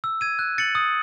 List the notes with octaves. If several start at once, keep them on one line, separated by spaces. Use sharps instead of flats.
E6
G#6 D#7
F#6
A6 C#7 F#7
D#6